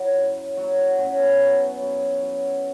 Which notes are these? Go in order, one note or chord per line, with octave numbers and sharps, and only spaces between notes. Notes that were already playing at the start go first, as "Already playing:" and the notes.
Already playing: F#3 E4
F#2
F#3 F#4
F#4
F#2 C#4
B3
F#3
F#2
F#3